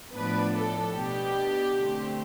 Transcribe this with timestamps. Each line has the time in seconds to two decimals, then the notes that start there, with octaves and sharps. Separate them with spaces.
0.15 A2 F3 B3 D4 B4
0.55 A4
0.96 B2 B3 D4 G4
1.77 D3 A3 C4